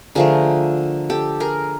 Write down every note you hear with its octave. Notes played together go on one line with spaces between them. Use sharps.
D3 F3 A3 G#4 A#4
G4 A4
G#4 A#4